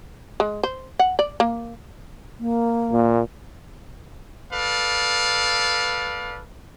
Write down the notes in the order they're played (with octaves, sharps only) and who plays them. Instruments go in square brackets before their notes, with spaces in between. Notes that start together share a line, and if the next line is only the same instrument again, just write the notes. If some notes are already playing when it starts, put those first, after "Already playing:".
[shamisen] G#3
C5
F#5
D5
A#3
[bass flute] A#3
[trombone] A#2
[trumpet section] A4 B4 D5 F5